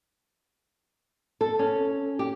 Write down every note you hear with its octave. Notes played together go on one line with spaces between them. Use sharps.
A4
C#4
G4